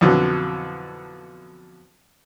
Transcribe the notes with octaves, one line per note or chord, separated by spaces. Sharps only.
F2 B2 D3 E3 F#3